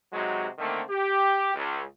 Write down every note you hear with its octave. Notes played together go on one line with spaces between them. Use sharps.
C3 F#3 G#3 D#4 F#4
D3 D#3 A3 A#3 C4
G4
C#2